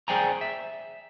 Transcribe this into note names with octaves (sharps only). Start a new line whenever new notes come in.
G#4 C5 D5 G5 G#5 A#5
E5